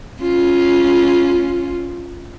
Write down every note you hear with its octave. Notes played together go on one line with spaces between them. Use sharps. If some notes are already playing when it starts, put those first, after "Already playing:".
C#4 F4